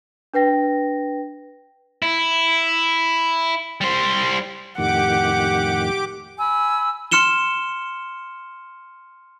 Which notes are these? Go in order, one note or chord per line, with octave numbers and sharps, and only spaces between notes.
D4 B4 G5 A#6
E4
G3 C5
F2 A2 D#3 G4 F#5 D6
G#5 B5 E6
C6 F6 C#7 E7 G7